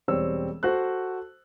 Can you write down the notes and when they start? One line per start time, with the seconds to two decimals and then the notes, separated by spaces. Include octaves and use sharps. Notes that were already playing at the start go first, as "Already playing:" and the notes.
0.08 E1 G3 C4 C#5 E6
0.63 F#4 A4 C5 F#6